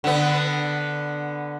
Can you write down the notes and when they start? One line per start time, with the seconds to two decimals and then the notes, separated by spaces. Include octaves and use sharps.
0.04 D3 B3